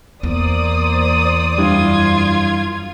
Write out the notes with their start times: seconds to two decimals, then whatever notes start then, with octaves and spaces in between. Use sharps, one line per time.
0.23 E2 A#3 C5 D5 D#6
1.58 F#2 G3 D4 E4 F4 G#6